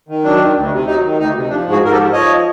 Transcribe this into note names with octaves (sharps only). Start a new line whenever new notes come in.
D#3
F#3 D4
D#3
D2
C3
F#3 D#4
D#3
D2 D#4
C3
F3 D4
G#2
F#4 G#4
G#2 A#4
G4 A4
F3
F3 C#5 D#5